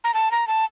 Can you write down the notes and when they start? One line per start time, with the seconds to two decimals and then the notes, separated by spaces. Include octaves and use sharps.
0.04 A#5
0.14 A5
0.31 A#5
0.48 A5